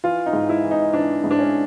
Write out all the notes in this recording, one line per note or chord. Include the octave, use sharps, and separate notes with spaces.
E3 F4
D#4
G#2
E4
E3
D#4
E3 D4
G#2
D4
C#4